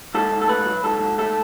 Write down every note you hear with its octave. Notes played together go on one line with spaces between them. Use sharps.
G#2 A4
G#2
A4
A3 B4
F#3
G#2 A4
G#2
A3 A4